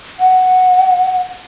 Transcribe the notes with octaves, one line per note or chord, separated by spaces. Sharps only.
F#5